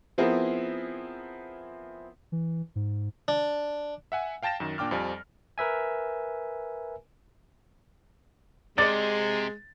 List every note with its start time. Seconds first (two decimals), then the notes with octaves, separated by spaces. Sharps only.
0.18 F3 B3 C4 E4 G#4 A#4
2.32 E3
2.76 G#2
3.28 D4
4.12 E5 F#5 G#5
4.43 F5 G5 A5 A6 A#6 E7
4.60 F#2 D#3
4.78 A#2 D4 G5 D6 F6
4.91 F2 F3 G3 D5 G#5
5.58 A#4 B4 E5 G#5
8.78 C3 G#3 D5 D#5 A6